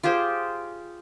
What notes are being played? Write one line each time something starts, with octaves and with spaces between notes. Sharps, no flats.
F4 G4 G#4 C5